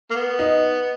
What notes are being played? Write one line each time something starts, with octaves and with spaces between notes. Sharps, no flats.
A#3
B3
D#4